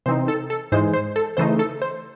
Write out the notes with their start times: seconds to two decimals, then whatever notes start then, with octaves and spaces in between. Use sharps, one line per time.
0.06 C3 E3 C4 D#4 C5
0.28 A4
0.50 A4
0.72 G#2 E3 G#3 C5
0.93 C5
1.16 A4
1.37 C#3 E3 A3 D#4 C5
1.59 A4
1.82 C5